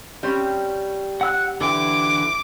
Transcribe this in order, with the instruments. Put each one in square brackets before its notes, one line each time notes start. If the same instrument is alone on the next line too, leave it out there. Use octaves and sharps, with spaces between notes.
[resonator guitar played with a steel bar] G3 C4 C#4
[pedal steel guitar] F#5 E6 F#6
[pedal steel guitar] D3 E3 G5 [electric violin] D6